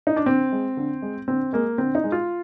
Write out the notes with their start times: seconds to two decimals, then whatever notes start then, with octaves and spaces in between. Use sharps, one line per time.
0.07 D#4
0.16 D4
0.26 D3 C4
0.52 G#3
0.77 D3
1.02 G#3
1.28 D3 C4
1.53 G#3 A#3
1.78 D3 C4
1.95 D#4
2.04 G#3
2.12 F4